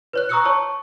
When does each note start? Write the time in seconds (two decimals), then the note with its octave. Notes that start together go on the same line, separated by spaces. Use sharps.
0.13 B4 C#5 F#6
0.29 A#5 C#6 D#6 E6 F#6 C#7
0.45 C#5 A5 C#6